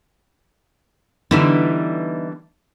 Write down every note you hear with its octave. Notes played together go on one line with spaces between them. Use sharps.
D3 E3 G3 B3 D#4 E4